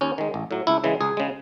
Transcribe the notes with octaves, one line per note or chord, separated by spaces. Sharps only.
D#2 C#4
D#3 G#3
A1
A2 F#3
C#2 E4
C#3 E3 G#3
C#2 G#4
C#3 G#3